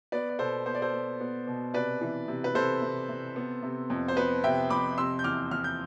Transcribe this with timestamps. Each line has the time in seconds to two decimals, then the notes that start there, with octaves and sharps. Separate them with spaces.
0.12 B3 B4 D5
0.30 D5
0.39 B2 A4 C5
0.66 B3 C5
0.75 D5
0.82 A4 C5
0.93 B3
1.21 B3
1.47 B2
1.74 C3 B4 D5
2.01 E3
2.28 C3
2.44 B4
2.55 C3 A4 C5
2.82 C3
3.09 C3
3.36 B3
3.63 C3
3.90 F2
4.08 C5
4.17 B3 B4
4.44 C3 E5 G5
4.70 F2 B5 D6
4.98 C3 C6 E6
5.19 G6
5.24 E2 D6 F6
5.51 E2 F6
5.64 G6